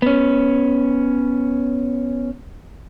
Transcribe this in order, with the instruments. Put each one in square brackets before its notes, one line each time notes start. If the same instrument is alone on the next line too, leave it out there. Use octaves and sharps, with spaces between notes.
[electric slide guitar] B3 C#4